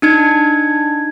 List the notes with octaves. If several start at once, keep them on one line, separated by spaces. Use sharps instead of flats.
D4 D#4 G#6